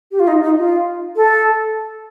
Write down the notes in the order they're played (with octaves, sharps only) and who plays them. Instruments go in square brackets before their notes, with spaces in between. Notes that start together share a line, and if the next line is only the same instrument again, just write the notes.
[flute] G4
F4
D#4
D#4
F4
A4